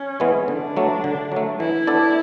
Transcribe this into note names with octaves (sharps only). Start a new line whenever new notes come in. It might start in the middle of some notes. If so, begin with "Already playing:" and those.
Already playing: C#4
E3 G#3 B3
D3 D4
F#3 A3
D3
F#3 A3
E3 E4
B3 D4 A4 D5